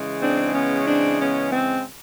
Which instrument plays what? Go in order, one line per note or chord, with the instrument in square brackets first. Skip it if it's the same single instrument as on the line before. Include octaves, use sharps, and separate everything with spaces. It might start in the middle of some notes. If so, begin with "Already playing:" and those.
Already playing: [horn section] C#3 E3 G#3
C4 D4
B3 C#4
C4 D4
B3 C#4
C4